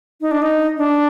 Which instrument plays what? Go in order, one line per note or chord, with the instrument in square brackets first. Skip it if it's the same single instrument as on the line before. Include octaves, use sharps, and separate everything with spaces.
[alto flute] D#4
D4
D#4
D4